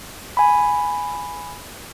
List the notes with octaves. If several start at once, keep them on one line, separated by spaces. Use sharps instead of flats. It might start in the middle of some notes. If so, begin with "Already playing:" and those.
G#5 B5